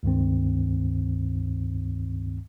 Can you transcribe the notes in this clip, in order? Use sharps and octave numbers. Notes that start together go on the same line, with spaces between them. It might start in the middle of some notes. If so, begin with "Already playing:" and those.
C#2 G2 D#3 C4